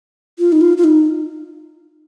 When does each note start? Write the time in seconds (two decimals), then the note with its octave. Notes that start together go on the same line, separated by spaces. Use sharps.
0.39 F4
0.52 D#4
0.61 F4
0.77 F4
0.84 D#4